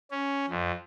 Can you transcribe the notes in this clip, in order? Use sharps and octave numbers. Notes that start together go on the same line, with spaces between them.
C#4
F2